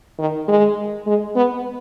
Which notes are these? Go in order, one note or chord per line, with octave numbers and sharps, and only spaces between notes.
D#3
G#3
G#3
B3